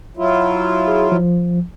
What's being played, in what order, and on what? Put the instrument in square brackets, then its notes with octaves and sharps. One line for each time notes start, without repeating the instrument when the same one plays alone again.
[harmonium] F#3 E4 F4
[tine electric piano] G#4
F3